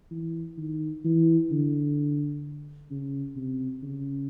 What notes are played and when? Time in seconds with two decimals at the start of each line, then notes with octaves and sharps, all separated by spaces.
0.11 E3
0.58 D#3
1.05 E3
1.51 D3
2.91 C#3
3.36 C3
3.83 C#3